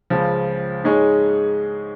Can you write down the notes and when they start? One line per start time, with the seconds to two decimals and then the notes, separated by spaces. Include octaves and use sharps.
0.10 C#2 C#3 F3
0.84 G#2 G#3 D#4 G#4 C#5